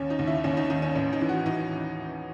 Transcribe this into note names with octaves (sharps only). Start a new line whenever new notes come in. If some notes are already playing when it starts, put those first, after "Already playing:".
Already playing: D#2 C#4
D#4
D#2
E4
D#2 C#4
D#4
D#3 D#4
C#4
A1 C#4
D#4
E3
F#4
E3 D#4